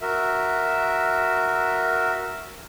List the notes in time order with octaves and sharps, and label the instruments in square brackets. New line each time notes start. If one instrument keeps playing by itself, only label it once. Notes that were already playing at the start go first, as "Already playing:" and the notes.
[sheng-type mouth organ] F#4 A#4 E5